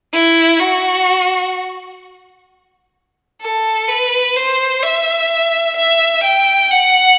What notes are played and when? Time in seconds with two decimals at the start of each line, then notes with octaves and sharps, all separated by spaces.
0.13 E4
0.60 F#4
3.42 A4
3.88 B4
4.36 C5
4.83 E5
5.76 E5
6.23 G5
6.71 F#5